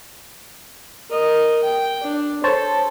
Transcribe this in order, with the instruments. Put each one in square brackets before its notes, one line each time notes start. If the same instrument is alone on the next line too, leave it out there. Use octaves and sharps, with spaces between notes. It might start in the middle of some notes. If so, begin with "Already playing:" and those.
[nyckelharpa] A#4 D#5
G5
D4
[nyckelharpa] A4 [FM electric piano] C5 C#5 A5